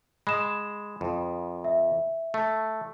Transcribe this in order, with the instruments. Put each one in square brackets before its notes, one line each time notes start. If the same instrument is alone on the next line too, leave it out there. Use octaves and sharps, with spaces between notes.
[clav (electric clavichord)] G#3 [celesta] B5 D#6 E7
[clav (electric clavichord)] F2
[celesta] E5
[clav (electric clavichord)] A3